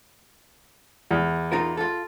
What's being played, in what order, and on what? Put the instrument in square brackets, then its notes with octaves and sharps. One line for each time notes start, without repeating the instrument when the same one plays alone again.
[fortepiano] E2
[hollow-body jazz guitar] D#4 F4 A#4
F4 A4